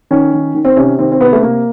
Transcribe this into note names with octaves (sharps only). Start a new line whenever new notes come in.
D#3 C#4
D#3
D#3
C4
C3 C#4
D#3 C4
C4
C3 B3
A3
C3 A#3